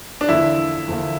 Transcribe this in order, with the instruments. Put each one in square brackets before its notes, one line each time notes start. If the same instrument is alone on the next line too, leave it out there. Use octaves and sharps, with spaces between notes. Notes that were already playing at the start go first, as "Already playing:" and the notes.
[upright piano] D4
[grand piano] E2 D3 F3 A#3 [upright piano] E4
[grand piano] E2 D3 F3 A#3